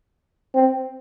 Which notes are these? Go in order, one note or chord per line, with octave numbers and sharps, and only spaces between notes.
C4